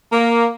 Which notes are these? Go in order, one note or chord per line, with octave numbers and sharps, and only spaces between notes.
A#3